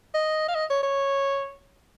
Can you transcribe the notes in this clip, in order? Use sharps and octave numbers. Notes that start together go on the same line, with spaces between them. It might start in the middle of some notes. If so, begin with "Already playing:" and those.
D#5
F5
D#5
C#5
C#5